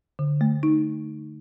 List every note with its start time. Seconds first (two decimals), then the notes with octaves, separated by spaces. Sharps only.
0.19 D3
0.41 A3
0.63 D#4